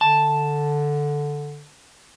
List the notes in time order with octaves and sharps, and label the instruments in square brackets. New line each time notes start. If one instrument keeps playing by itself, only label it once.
[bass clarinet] D3 [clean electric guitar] A5